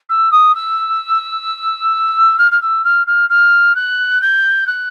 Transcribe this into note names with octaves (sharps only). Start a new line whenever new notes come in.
E6
D#6
E6
F6
F6
E6
F6
F6
F6
F#6
G6
F#6